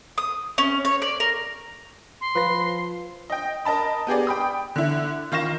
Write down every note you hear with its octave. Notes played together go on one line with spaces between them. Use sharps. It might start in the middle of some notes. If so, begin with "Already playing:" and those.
D#6
C#4
C#5
D5
A#4
C6
F3 B4 A#6
D#5 G5
A#4 D#5 A5 B5
B3 G4 G#4 D5
G5 B5 D#6
D3 E4
D#3 F4 C#6 A#6 E7